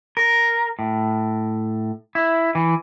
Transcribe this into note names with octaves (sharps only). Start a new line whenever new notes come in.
A#4
A2
E4
E3